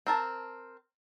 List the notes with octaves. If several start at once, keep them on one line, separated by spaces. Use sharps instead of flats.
C4 A#4 A5